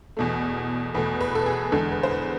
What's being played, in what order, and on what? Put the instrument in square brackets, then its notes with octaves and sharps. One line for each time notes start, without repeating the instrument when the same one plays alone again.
[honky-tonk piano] E2 B2 A3
E2 B2 A3 B4
B4
A4
G#4
E2 D3 G#3 A4
B4
C5
B4